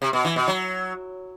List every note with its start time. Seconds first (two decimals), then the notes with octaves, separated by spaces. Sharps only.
0.02 C3
0.13 B2
0.25 E3
0.36 B2
0.48 F#3